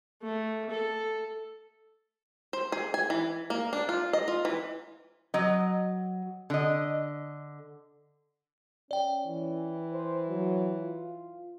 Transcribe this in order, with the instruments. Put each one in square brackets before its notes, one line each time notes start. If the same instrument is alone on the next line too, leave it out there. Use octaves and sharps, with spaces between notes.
[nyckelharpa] A3
A4
[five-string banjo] C5
G#4
G#5
E3
A#3
D4
F4
D#5
F4
E3
[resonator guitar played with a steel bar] F#3 D#5
D3 D#5
[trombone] C#4 [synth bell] D5 G5
[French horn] E3
[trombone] C5
F#3
F4